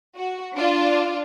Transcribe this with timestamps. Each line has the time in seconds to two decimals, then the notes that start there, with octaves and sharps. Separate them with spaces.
0.16 F#4
0.56 D4 F4